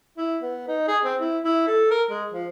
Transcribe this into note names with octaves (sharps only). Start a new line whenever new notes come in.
E4
B3
D#4
G#4
C4
E4
E4
A4
A#4
G#3
F3